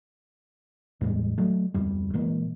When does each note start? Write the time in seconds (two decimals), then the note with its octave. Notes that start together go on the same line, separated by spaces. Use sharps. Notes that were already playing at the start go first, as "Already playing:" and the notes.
1.01 E2 A2 G3 G#3
1.38 F#3 A3
1.74 D1 F2 G3
2.14 A#2 E3 G#3 A#3